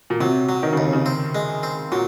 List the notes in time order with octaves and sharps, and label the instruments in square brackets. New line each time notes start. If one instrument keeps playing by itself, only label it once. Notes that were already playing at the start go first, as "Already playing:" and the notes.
[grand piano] A#2
[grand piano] C3 [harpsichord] F#3
[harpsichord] F#3
[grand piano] D#3
[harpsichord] D#2 [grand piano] C#3
[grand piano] C3
C#3
[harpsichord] C4
G#3
C4
[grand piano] A#2 [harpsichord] F#3